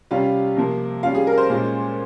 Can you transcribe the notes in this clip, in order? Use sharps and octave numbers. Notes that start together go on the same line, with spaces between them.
C3 G3 C#4 F4 F5
C3 F3 A#3
G3 C#4 F4 F5
G#4
A#4
C5
A#2 G#3 C#4 F4